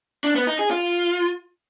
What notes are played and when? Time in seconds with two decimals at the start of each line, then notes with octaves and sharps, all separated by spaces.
0.24 D4
0.36 B3
0.47 D#4
0.59 G#4
0.71 F4